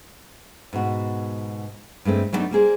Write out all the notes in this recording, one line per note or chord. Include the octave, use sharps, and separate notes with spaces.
G#2 B2 F#4
G2 G#3 A3 C4
F#3 G3 A3 B3 D4 D#4
G3 A#3 G#4 C5